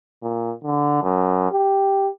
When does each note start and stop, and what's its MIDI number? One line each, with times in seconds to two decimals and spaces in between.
0.23 0.52 46
0.64 1.00 50
1.02 1.51 42
1.52 2.10 67